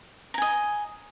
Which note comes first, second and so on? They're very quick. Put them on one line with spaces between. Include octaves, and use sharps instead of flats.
A#5 G#5 D#5